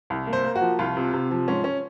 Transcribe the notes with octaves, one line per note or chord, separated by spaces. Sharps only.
C2
A#3
C5
A#3
F#4
F3
C2 F4
C3
C3
F3
G#2 C#4
C#4